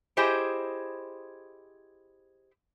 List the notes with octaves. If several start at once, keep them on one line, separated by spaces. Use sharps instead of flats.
E4 G4 G#4 C5 D#5